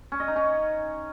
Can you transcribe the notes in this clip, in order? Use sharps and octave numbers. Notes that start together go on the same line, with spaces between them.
C#4
D#5
D#4
C#4